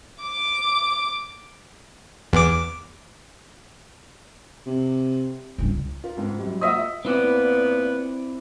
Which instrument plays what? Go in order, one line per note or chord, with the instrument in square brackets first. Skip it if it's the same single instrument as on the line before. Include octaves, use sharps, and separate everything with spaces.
[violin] D6
[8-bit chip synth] E2 D6
[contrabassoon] C3
[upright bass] C#2 G2
[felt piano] F4 A#4
C#2 G#2
F#2 G3
[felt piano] A#3 F4 F#5 [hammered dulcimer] D#5 E5
[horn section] A#2 B3 [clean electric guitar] C4 E4 D5